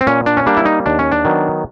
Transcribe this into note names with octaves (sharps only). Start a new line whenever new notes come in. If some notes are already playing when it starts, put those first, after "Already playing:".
C4
A#2 C#4
D4
C#4
G3 A#3 D4
E4
D#4
D#2 D4
C#4
D4
D#3 F#3 B3